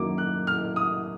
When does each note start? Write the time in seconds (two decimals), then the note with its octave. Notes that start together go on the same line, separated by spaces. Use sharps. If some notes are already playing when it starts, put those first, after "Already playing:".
Already playing: F#2 D#3 F#3 A#3 D6
0.18 F#6
0.47 F6
0.76 D#6